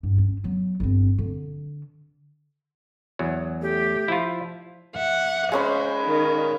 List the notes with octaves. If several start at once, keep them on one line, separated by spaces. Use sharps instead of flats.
G2
C#4
F#3 B3
G1 C4
D3
E2 F#3
A3 G4
F3 E4 F4
F2 E5 F#5
G#3 C#4 B4 C5 D5 F5
D#3